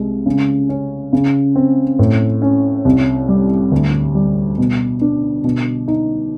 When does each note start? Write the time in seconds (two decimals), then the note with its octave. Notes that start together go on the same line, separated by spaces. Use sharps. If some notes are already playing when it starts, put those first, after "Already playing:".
Already playing: C2 G#3
0.26 C#3
0.69 C#4
1.13 C#3
1.56 C4
1.99 A2
2.42 C#4
2.85 C2
3.29 G3
3.72 D2
4.15 G3
4.58 B2
5.01 D4
5.44 B2
5.88 D#4